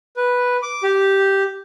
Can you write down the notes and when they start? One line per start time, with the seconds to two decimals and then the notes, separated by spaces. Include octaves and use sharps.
0.16 B4
0.62 D6
0.83 G4